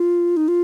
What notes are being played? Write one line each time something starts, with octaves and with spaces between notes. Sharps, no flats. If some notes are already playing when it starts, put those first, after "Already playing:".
Already playing: F4
D#4
F4